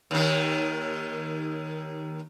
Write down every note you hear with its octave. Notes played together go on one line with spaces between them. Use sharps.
D#2 D#3